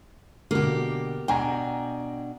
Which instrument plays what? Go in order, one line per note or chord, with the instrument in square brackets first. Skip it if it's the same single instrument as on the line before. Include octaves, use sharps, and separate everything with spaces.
[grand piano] B2 D3 [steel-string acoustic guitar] A#3 G4
[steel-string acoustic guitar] B2 D4 [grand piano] G5 G#5 A#5